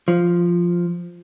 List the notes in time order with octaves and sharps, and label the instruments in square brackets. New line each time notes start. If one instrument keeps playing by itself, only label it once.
[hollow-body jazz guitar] F3